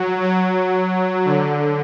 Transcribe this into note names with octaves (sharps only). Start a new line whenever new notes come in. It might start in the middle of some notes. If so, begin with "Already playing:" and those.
Already playing: F#3
F#3
D3